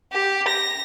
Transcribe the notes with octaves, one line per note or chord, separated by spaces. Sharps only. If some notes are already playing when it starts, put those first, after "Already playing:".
G4
A#6